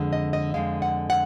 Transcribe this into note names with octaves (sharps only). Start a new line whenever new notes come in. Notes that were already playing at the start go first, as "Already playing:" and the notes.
Already playing: F2 D3 G#3
D#5
D#5
F2 D3 G#3 F5
F#5
F#5